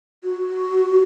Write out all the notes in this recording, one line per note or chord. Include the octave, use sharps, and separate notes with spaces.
F#4